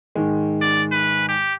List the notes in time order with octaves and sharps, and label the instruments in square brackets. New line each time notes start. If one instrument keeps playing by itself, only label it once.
[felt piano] G#2 D#3 G#3
[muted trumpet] D5
B4
G4